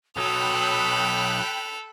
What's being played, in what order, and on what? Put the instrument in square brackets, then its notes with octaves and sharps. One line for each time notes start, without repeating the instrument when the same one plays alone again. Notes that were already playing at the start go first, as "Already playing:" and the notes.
[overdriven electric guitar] B1 F#3 [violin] A4 F7 [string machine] G5 B5 F#6 [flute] D#6